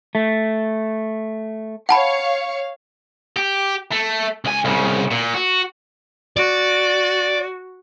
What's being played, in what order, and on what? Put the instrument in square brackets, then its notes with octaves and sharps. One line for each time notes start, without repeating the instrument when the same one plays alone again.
[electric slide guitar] A3
[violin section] C#5 F5 C#7 [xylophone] F#5 A5 B5
[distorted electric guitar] G4
A3
C#2 G#5
C2 C#3
A#2
F#4
[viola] F#4 [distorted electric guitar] D5